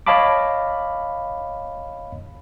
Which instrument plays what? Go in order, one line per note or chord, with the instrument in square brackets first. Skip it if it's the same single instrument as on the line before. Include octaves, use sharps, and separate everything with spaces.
[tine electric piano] C#5 D#5 F5 A5 B5 D6